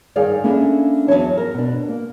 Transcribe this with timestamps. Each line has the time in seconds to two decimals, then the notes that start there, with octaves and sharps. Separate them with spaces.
0.16 G2 D#3 G#4 D5 F5 G5
0.44 A#3 C#4 D4 E4 A4
1.08 E2 G2 F#3 E4 C#5 A5
1.37 A#4
1.54 B2 D4
1.88 A#3